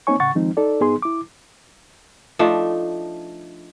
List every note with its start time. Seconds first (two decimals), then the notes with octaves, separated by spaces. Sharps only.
0.07 A#3 C4 D#4 C#5 G#5 C#6
0.20 A2 C#3 F#5 C#6 A6
0.35 D#3 F3 G#3 C4 D#4
0.57 D#4 A4 D5
0.80 G#2 B3 D#4 G#4 C6
1.02 E4 D6
2.39 F3 A3 D4 D#4